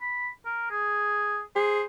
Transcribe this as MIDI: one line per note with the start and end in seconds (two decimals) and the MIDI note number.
0.01 0.28 83
0.45 0.68 70
0.70 1.40 68
1.56 1.84 68
1.56 1.82 72